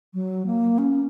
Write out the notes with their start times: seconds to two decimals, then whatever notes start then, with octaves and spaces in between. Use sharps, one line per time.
0.14 F#3
0.46 A#3
0.78 C#4